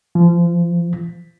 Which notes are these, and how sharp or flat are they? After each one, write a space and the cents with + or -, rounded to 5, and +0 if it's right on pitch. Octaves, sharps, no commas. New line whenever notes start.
F3 -25